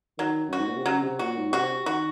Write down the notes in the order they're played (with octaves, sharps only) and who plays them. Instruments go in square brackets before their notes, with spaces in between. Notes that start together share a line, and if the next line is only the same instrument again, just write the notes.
[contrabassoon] D#3 [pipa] F#3
[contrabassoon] F#2
[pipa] F#4
[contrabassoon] G#2
A#2
C3
[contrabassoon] C#3 [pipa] F#3
[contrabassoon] C3
[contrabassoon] A#2 [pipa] F#4
[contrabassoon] G#2
[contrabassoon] C3 [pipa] F#4
[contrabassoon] D#3 [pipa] F#4